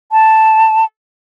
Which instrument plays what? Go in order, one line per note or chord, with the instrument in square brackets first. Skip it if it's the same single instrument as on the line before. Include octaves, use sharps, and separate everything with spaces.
[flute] A5